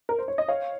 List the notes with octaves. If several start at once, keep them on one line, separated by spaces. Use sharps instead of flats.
A#4
C5
C#5
D#5
C#5 F5